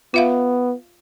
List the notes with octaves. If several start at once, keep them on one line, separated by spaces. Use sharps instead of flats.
B3 F4 E5 F5